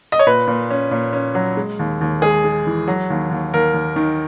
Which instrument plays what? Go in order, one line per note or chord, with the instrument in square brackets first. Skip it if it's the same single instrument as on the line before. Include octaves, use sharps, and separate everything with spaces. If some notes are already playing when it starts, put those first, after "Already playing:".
[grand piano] D#5
C#5
A#2 B4
A#2
C#4
A#2
C#4
F#3
G#3
D#2
D#2
G#3 G#4
G#3
E3
F#3
D#2
D#2
D#2 A#4
D#2
D#3